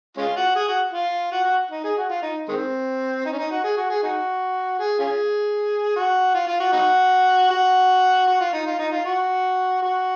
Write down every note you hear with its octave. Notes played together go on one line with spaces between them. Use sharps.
G#3 C#4 F4
F#4
G#4
F#4
F4
F#4
F#4
D#4
G#4
F#4
F4
D#4
D#3 G#3 C4
D#4
C#4
D#4
F#4
G#4
F#4
G#4
D#4 F#4
G#4
C#4 F4 G#4
F#4
F4
F4
F#4
D#4 F#4
F#4
F#4
F4
D#4
F4
D#4
F4
F#4
F#4